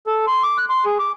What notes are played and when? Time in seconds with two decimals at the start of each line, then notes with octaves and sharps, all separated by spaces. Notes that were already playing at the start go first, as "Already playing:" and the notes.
0.07 A4
0.27 C6
0.43 D6
0.58 F#6
0.70 C6
0.85 G#4
0.99 D6